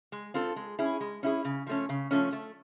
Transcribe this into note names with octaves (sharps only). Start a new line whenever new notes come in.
G#3
C4 F4 A4
G#3
C#4 E4 G#4
G#3
C#4 E4 G#4
C#3
F3 A3 C#4
C#3
F3 A3 C#4
A3